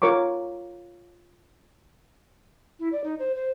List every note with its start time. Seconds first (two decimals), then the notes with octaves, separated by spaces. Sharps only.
0.02 F4 A#4 C#5 C#6 D6
2.79 E4
2.92 D5
3.04 D#4
3.19 C5
3.35 C5